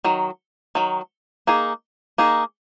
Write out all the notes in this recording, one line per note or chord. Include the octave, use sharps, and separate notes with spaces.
D#3 F#3
D#3 F#3
A#3 D#4 G#4
A#3 D#4 G#4